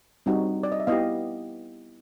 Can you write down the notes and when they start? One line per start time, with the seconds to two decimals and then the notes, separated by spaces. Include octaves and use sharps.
0.26 G3 C4 D#4 F#4
0.63 D5
0.72 D#5
0.80 E5
0.87 B3 E4 G4 D#5 F5